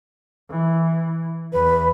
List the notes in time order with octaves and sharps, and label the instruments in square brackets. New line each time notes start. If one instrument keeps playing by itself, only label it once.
[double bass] E3
[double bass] E2 [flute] B4